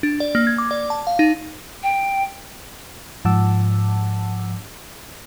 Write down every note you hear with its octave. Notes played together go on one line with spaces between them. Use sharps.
D4
D5
A#3
G#6
D6
D5
A5
F5
D#4
G5
G#2 F3 F#5 A5 D6 E6